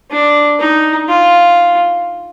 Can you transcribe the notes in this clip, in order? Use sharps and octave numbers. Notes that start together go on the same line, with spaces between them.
D4
D#4
F4